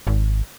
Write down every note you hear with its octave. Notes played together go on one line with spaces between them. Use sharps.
G#1